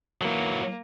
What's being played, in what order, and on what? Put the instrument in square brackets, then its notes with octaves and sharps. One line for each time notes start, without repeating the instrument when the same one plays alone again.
[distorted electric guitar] E3 F#3 [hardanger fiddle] A#3